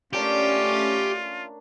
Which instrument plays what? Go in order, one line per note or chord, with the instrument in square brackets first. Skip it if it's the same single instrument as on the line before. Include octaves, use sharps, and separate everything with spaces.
[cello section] A3 C#4 [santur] A#3 D4 C#5 [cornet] F4 [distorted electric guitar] G4